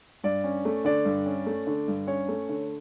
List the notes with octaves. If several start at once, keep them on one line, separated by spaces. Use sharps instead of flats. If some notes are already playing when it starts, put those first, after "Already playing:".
G2 D5
C#4
A3
D3 D5
G2
C#4
A3
D3
G2
C#4 C#5
A3
D3